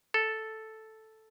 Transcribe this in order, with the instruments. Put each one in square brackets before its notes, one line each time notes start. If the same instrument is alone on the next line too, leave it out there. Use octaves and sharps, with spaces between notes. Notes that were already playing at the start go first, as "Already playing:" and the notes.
[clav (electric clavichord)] A4